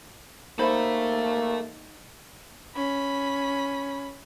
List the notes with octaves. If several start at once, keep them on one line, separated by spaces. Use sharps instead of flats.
A#3 D#4 A4 C5 E5 B5
C#4 B5